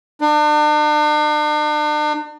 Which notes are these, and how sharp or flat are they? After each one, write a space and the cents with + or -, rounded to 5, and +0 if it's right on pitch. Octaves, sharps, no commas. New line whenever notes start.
D4 +40